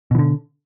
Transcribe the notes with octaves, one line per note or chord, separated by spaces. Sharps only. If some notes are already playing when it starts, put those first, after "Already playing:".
B2 D3 E3